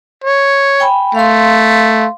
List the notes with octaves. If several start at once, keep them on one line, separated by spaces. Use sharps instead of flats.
C#5
G5 G#5 B5
A3 F5 C6